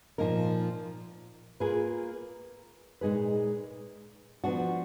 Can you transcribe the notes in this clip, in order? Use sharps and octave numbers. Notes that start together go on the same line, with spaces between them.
A#2 F3 A#3 D#4 A#4
A#3 F4 G#4 B4
A#2 G#3 D#4 G#4 B4
F3 B3 D4 F#4